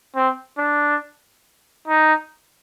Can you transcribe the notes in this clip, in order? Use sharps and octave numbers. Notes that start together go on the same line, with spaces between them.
C4
D4
D#4